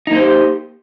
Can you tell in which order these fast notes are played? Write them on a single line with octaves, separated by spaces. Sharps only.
D#4 A#3 C5 G4